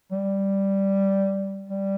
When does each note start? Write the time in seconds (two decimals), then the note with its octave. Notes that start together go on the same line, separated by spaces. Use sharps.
0.12 G3
1.69 G3